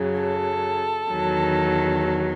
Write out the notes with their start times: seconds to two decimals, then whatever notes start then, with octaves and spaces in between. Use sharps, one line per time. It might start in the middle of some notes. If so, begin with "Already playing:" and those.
Already playing: F#2 C#3 F#3
0.21 A4
1.10 E2 D#3 F#3